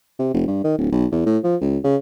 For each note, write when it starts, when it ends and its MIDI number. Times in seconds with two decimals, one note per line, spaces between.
0.19 0.33 48
0.34 0.44 29
0.48 0.59 43
0.64 0.76 51
0.78 0.90 26
0.92 1.06 35
1.12 1.23 40
1.26 1.38 45
1.44 1.56 53
1.61 1.78 37
1.84 1.96 49